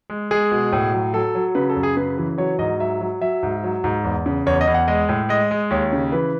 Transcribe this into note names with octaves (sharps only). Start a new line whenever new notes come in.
G#3
G#3 G#4
B2
A2
F#3
F#3 A4
F#3
C#3 B4
A4
F#2
G#4
C#3 B4
E3
F#3 C#5
G#2 D#5
F#3 E5
F#3
F#3 E5
G#2
F#3
G#2
E2
C#3
E2 C#5
D#5
E2
F#5
G#3 D#5
A2
G#3 D#5
G#3
D#2 C#5
C#3
E3 B4